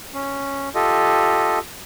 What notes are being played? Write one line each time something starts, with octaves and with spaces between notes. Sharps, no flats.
C#4
F4 G4 A4 D#5